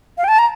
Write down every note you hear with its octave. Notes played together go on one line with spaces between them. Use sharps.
F5
G5
A5
A#5